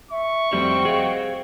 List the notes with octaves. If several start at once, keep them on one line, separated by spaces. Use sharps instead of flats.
E5 C#6
F2 G3 A3 C4 F#4 G5
G#4 D#5 F5